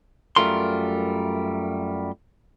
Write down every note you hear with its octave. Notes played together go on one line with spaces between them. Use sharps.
F#2 G3 A3 F4 A#4 C6